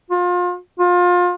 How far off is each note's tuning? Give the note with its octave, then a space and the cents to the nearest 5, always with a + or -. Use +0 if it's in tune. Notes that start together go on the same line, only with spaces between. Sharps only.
F4 +30
F4 +30